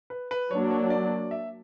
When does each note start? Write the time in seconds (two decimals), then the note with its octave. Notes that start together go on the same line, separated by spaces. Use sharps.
0.10 B4
0.31 B4
0.50 F#3 A#3 D4 C#5
0.71 C#5
0.90 D5
1.31 E5